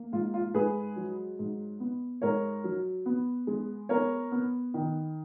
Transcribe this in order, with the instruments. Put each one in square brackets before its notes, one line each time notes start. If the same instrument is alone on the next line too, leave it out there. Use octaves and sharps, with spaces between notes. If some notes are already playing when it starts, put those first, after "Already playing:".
Already playing: [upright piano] A#3
G#2 F4
F4
G#2 G#4 B4
F#3
G#2
B3
G#2 A#4 C#5
F#3
B3
G#3
B3 A#4 C#5
B3
D#3